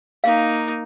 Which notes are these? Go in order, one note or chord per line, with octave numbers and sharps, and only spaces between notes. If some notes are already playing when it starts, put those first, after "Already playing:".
A#3 D#4 F5